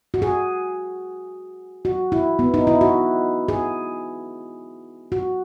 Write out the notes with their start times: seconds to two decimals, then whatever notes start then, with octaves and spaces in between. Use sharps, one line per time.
0.14 F#4
0.22 G#4
1.85 F#4
2.12 E4
2.39 B3
2.54 D#4
2.67 E4
2.81 F#4
3.48 G#4
5.12 F#4